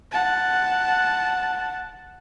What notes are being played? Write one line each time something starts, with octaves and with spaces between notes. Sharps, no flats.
F#5 A5